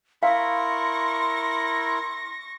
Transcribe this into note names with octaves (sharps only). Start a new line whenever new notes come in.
E4 A#4 F5 C6 C#6 A#6